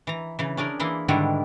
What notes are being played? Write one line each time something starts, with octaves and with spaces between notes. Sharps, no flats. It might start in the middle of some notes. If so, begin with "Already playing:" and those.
E3 A#5
C#3 E3
C#4 D4 G#4 A#4
E3 A#3 E4 G#4 C6
G#2 D3 D#3 G3 D4 E4